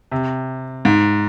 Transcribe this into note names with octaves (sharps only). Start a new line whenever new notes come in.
C3
G#2